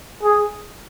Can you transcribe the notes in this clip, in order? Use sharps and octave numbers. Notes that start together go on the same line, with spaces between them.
G#4